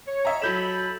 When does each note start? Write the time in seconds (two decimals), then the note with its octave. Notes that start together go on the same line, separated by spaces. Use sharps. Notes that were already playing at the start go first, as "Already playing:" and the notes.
0.07 C#5
0.25 D#5 E5 A#5
0.42 F#3 A4 B5 G6 E7